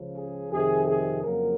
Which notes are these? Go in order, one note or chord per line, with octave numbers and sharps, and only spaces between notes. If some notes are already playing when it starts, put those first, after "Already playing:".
Already playing: C#2 C#3 F3
G#4
F2 C3 D#3 G#4
G#4
F2 C#3 F#3 A#3 A#4